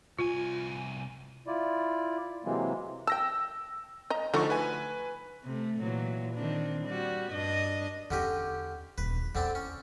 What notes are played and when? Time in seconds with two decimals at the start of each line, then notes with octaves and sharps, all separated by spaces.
0.19 C2 F4 G#5
1.47 E4 F4 D5
2.45 C3 E3 F#3 G#3 A#3 C4
3.07 G5 A5 E6 A#6
4.10 D#5 A#5
4.34 D3 F3 A3 D#4 F#4 C#6
4.50 B4 G#5
5.44 C3 A3
5.80 A#2 E3 F#3
6.35 D#3 C4 D4
6.86 G3 F#4
7.33 G2 D4 D#5
8.11 E2 D3 C#4 D4 G4
8.98 D#1 D#2 B4
9.16 E2
9.35 E2 D3 C4 D4 E4
9.55 C#4